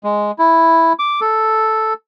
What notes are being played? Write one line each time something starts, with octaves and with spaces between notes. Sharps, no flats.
G#3
E4
D6
A4